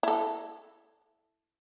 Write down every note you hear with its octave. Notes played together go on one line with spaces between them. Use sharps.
E4 A4